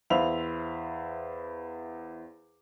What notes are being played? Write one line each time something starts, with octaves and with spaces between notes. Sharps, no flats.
E2 C5 E5 F5 B5 F7